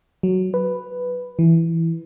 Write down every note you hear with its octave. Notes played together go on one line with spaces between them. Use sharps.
F#3
B4
E3